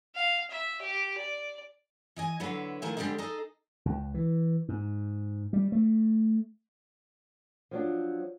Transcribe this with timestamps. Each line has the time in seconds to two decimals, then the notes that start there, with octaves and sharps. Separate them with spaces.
0.15 F5
0.51 E5
0.82 G4
1.18 D5
2.16 E3 D#5 G#5
2.40 D3 F#3 E4 B4 C#5
2.82 D#3 F3 A3 E4 G#5
2.97 D3 G3 G#3 C4 D4 D#4
3.18 D#4 G#4 A4 D#5
3.85 C#2
4.14 E3
4.69 G#2
5.53 G3
5.72 A3
7.71 F3 F#3 D4